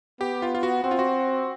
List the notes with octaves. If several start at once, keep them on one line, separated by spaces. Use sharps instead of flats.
B3 G4
F4
F4
F#4
C4 F#4
F4
F#4